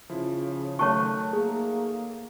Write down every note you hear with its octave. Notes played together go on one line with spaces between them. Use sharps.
C#3 F3 E4
D#3 F#3 A3 C#5 A5 C#6 F#6
A#3 G#4